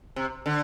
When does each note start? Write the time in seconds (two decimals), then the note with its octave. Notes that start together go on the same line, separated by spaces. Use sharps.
0.16 C3
0.46 D3